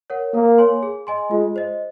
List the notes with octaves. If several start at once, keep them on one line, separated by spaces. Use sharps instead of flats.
A#4 C#5 F#5
A#3 A#4
C#5 G#5 C6
G#4
D#5 G#5 C6
G#3 F4
C5 D#5